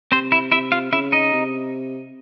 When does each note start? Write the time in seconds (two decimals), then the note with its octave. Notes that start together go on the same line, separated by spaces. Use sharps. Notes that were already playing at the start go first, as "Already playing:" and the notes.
0.12 C3 C4 C5
0.32 E4 E5
0.52 C3 E4 E5
0.72 F4 F5
0.92 C#3 E4 E5
1.12 D#4 D#5
1.33 C3